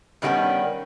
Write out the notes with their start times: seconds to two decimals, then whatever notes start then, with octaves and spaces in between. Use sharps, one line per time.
0.22 G2 D#3 G3 A#3 B3 C#4